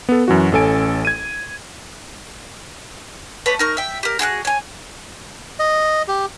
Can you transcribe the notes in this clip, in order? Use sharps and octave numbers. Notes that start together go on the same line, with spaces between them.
B3 A4
F#2 E3 F#4
A1 C#4 A4 G#5 D7
G#6 D#7
A3 B4 C#5 D6
D#4 A#4 C#6
E5 G5
G4 A#4
F#4 G#4 E6 F#6
C#5 G#5
D#5
G4